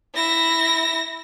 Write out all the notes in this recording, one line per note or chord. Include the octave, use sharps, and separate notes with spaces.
E4 A#6